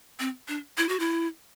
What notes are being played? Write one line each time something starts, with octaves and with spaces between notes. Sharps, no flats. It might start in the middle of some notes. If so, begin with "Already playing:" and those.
C4
D4
E4
F#4
E4